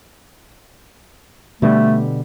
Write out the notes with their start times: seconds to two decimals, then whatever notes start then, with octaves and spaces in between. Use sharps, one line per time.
1.62 B2 D3 G3 A3